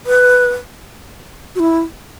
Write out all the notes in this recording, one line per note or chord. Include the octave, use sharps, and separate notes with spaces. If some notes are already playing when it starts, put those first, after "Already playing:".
B4
F#4
E4